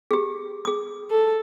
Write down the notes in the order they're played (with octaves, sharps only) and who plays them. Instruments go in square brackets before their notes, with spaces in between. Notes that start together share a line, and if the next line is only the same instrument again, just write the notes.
[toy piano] G4 G#4
G#4 D#6
[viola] A4